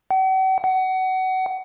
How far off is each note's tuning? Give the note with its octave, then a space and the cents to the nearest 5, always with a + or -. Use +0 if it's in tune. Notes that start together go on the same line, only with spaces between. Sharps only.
F#5 +45
F#5 +25